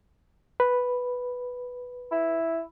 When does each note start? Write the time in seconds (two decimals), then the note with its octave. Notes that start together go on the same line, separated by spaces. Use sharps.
0.60 B4
2.12 E4